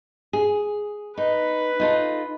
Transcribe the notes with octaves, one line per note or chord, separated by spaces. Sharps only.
G#4
D#4 B4
D#4 F4 A4